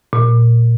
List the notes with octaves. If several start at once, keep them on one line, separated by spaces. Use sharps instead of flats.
A#2